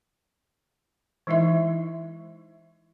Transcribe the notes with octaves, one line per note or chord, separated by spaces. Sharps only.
E3 G#3 D#4 E4 E5